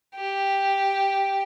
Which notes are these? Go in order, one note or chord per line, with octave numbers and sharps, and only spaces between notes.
G4